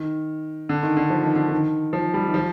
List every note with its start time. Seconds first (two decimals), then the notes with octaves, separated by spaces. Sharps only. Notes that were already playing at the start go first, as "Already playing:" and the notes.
Already playing: D#3
0.69 D3
0.83 D#3
0.97 D3
1.10 F3
1.23 D#3
1.36 D3
1.48 D#3
1.93 F3
2.14 G3
2.27 D#3
2.34 F3